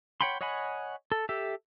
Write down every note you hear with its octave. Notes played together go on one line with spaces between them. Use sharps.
C#5 F#5 G5 B5 C6
C#5 D#5 F#5 G#5 B5
A4
G4 A4 E5